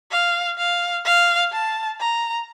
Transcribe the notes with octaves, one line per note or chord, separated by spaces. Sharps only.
F5
F5
F5
A5
A#5